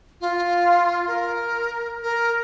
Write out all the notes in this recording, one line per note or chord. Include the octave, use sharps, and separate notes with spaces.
F4
A#4
A#4